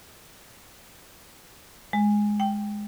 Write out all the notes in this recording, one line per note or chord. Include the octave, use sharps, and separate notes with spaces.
G#3
G5